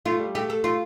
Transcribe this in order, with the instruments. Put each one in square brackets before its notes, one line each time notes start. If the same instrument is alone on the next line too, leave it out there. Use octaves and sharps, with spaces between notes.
[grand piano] A3 [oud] F4
[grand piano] G3
[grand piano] A3 [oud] G4
[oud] A4
[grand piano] A3 [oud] F4